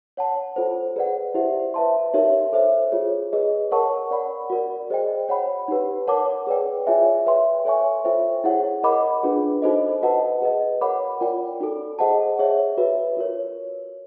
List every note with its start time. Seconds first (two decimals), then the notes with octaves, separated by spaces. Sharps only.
0.17 C#5 F#5 A5
0.56 F4 A4 C5
0.96 G#4 B4 D5 F#5
1.34 E4 G4 C5 E5
1.74 B4 E5 A5 C6
2.14 D#4 G4 A#4 C#5 E5
2.53 A4 C5 E5
2.92 F4 G#4 C#5
3.33 G#4 B4 D#5
3.71 A#4 C#5 F#5 A5 C#6
4.11 A#4 D5 F#5 B5
4.50 F#4 A#4 D5
4.90 G#4 C5 D#5 G5
5.29 C#5 F#5 B5
5.68 D#4 G4 B4
6.07 A#4 C#5 F#5 A5 D6
6.47 G#4 B4 D5 G5
6.87 F4 G#4 C#5 E5 G#5
7.26 B4 E5 G5 C6
7.65 A4 C#5 E5 G#5 C#6
8.04 F4 A4 C5 E5 G5
8.44 E4 G#4 C#5 F#5
8.83 A#4 D#5 F#5 B5 D6
9.23 D4 F4 G#4 B4
9.62 D#4 F#4 A4 C5 D#5
10.02 F#4 B4 D#5 F#5 A5
10.42 G#4 B4 D#5
10.81 A#4 C#5 F#5 B5 D6
11.20 F4 A#4 D5 G5
11.60 D#4 F#4 A4
11.99 G#4 C5 D#5 F#5 A5
12.39 G#4 C#5 E5
12.77 F#4 B4 E5
13.17 F4 A#4 C#5